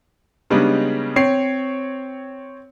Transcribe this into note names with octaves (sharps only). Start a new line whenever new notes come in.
C#3 G3 G#3 B3 D4 D#4
C4 C#5 C7